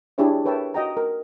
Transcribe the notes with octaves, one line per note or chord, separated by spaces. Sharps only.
D4 E4 G4 G#4 C#5 E5
A#4 B4 C#5 E5 G5 A5
F#4 D#5 G5 A#5
A#4